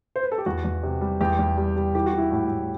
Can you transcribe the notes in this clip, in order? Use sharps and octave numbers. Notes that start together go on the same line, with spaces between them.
C5
B4
A4
G4
E2 F#4
E2
C3
G3
E2 G4
E2
G3
G3
E3 G4
F#4
E3 E4
A2 F#4
A2